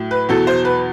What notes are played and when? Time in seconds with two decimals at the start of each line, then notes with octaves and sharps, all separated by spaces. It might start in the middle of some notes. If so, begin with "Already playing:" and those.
Already playing: A2 F#3
0.11 B4
0.29 E2 B2 F#3 A4
0.47 C5
0.65 B4